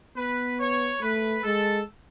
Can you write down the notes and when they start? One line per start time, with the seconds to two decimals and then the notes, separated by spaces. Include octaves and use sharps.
0.16 B3 B4
0.59 C#5
1.01 A3 B4
1.44 G#3 A4